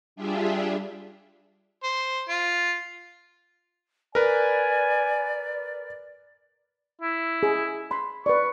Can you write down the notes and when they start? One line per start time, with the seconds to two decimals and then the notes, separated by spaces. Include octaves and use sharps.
0.16 G3 D4 F4 G4 G#4 E5
1.83 C5
2.29 F4
4.15 A#4 B4 D5 G#5
7.02 E4
7.43 G#4
7.91 B5 C6
8.26 B4 D5 C#6